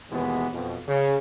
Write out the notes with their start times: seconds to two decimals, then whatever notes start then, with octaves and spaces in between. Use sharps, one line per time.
0.11 D#2 B2 E3 G#3 B3
0.53 F2 B2
0.88 C#3